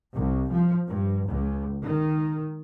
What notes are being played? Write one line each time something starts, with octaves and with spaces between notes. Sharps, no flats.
C2
F3
G2
C#2
D#3